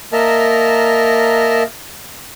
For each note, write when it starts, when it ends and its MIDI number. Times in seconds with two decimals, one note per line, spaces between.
0.13 1.63 58
0.13 1.63 70
0.13 1.63 75
0.13 1.63 76
0.13 1.63 81
0.13 1.63 89